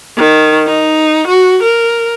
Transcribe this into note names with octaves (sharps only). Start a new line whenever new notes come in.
D#3
D#4
F#4
A#4